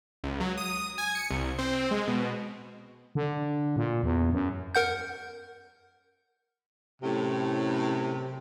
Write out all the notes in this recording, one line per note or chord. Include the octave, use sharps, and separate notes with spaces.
C#2
F#3
D#6
G#5
C#7
C2
C4
G#3
B2
D3
A#2
E2
F#2
A#4 F#5 G6
F#2 A2 C3